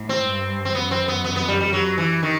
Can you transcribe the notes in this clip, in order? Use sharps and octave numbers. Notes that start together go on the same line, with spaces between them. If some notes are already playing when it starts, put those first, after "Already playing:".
Already playing: A2
C4
G2
C4
F#2 B3
C4
B3
B3
B3
G3
G3
F#3
E3
D#3